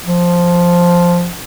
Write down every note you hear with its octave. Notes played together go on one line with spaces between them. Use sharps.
F3